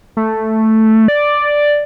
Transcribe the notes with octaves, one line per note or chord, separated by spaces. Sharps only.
A3
D5